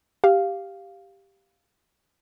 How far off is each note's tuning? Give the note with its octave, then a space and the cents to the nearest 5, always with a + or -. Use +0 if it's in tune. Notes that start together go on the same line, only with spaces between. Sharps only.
G4 +0 F5 +0